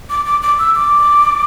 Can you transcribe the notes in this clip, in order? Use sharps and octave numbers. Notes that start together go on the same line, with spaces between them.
D6
D6
D6
E6
D6